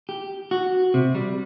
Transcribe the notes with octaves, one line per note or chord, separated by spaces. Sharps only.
G4
F#4
C3
G3